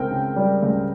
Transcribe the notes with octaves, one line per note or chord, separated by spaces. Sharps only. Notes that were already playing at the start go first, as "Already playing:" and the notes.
Already playing: C#2 C4 A#4 G5
C#3
G3
C#2